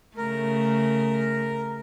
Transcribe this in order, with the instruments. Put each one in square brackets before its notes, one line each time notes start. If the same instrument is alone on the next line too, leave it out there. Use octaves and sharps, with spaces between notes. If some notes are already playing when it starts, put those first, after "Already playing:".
[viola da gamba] C#3 A3 [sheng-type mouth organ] A#4